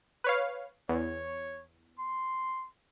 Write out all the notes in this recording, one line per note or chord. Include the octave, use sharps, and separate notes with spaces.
B4 C#5 F5
E2 C#5
C6